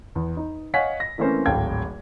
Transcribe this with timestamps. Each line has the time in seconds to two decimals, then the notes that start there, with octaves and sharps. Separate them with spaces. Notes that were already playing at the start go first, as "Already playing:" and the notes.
0.15 E2
0.37 D#4
0.74 C#5 D#5 F5 F#5 G#5 B6
1.00 A#6
1.18 E3 A3 A#3 C4 C#4 C5
1.46 D1 G#1 A4 F5 G5 G#6